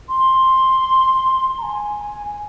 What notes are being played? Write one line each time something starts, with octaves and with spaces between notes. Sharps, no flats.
C6
A#5
G#5